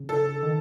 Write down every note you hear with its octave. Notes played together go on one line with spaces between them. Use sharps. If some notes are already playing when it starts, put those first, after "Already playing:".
Already playing: C#3
A4
D#3